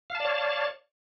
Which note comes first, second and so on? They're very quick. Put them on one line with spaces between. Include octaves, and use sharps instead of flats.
F5 A5 D5 C#5